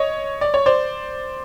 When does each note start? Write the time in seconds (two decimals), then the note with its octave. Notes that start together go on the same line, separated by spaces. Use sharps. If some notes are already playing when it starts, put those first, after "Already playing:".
Already playing: C#5 D#5
0.41 D5
0.54 C#5
0.66 C5 D5